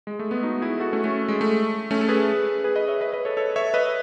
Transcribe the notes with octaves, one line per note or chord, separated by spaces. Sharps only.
G#3
A3
G#3 B3
D#4 F#4
E4 G#4
F#4 A4
A3 C#4
A3 C#4
G#3
A3
A3 C#4
A4
G#4 B4
G#4 B4
B4 D#5
C#5 E5
B4 D#5
B4 D#5
A4 C#5
A4 C#5
C#5 E5
B4 D#5